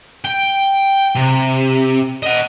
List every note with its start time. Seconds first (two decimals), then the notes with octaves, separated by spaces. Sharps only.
0.25 G5
1.15 C3
2.23 D#5 F#5